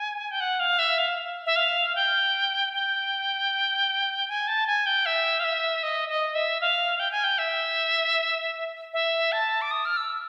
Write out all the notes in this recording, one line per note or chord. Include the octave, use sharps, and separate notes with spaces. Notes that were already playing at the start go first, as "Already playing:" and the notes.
Already playing: G#5
G5
F#5
F5
E5
F5
E5
F5
G5
G5
G#5
A5
G#5
G5
E5
F5
E5
D#5
D#5
E5
F5
G5
G#5
G5
E5
E5
A5
D6
D#6
F6
E6